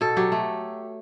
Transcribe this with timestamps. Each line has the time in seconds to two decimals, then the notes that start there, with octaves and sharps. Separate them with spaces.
0.01 B2 A4
0.17 F#3 G4
0.32 A3